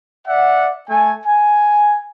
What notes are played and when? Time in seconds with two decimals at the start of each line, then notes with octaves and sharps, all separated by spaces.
0.25 D5 E5 F#5
0.87 A3 G#5
1.24 G#5